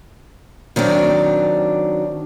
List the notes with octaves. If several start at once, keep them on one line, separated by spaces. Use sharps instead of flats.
D#3 F#3 C4 D4